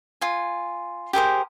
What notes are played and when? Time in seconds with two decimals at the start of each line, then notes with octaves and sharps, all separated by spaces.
0.21 F4 G#5
1.13 G4 G#4 A#4 C5